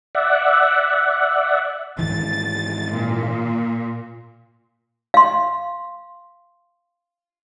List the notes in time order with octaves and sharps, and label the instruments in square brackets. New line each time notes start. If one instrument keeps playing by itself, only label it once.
[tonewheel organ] D5 E5 F#5
[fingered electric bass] G#2 D#3 E3 [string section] A6
[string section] A#2
[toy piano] F5 C6